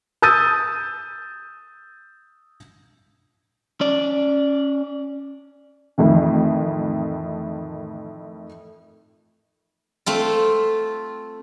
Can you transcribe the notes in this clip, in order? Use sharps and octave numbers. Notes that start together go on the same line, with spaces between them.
D#6 E6 G6 A6 D#7
C#4 D5
F2 A2 D#3 E3
A3 C4 F4